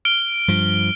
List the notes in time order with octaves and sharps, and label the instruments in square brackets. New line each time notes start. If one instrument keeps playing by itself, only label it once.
[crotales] F6 D7 G7
[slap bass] G2 F3